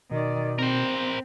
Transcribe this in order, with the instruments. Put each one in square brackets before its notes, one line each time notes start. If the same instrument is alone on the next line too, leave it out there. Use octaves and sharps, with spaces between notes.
[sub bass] B2 [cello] D#3 D5
[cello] C4 [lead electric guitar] A#4 C5